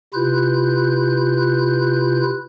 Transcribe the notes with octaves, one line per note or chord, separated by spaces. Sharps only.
C3 E4 F4 B4 F#6 G6